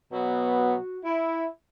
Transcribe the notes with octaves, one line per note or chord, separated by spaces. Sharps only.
B2 F#3 B3
F#4
E4